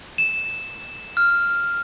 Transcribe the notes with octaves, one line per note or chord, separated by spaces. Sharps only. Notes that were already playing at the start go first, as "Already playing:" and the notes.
E7
F6